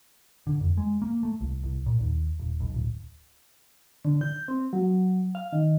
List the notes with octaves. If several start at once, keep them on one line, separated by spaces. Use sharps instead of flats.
D3
F2
G#3
A#3
A3
C2
C2
A#2
D#2
D#1
B1
D1
D3
G6
C4
F#3
F5
D#3